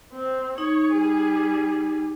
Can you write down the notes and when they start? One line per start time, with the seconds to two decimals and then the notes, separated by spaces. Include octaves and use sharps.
0.13 C4
0.58 D#4 C#5
0.92 G3 G#4